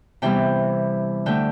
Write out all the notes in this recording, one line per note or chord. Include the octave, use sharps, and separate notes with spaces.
C3 E3 G3 B3 G5
D3 A3 G5